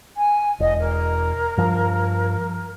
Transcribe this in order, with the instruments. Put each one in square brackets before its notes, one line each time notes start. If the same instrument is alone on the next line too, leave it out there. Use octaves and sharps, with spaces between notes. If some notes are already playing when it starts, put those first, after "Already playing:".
[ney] G#5
[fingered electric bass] E1 [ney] D#5
[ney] A#4
[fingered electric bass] G2 F3